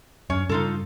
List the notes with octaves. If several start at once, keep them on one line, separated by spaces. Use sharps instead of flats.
F#2 C#4 C#5
G2 C#3 D#4 F4 A4